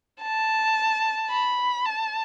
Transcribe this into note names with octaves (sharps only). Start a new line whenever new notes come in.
A5
B5
A5